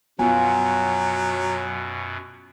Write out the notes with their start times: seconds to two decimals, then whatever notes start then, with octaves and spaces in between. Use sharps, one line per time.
0.19 F#2 B2 F#3 B3 F4 G#5